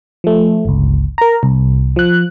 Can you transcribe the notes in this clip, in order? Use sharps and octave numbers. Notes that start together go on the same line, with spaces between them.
F3 A3
G1 C#2
A#4 A#5
C2
F3 F#6